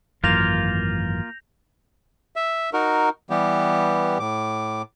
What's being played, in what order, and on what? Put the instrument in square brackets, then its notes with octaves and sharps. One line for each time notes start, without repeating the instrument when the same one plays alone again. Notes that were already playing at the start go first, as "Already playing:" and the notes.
[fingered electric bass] G#1 F#2 E3 [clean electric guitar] A#3 F4 [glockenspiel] G6 A#6 F7
[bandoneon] E5
D#4 F#4 A#4
E3 G3 B3 G4
A2 D6